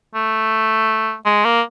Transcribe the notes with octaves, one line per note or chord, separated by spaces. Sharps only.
A3
G#3
A#3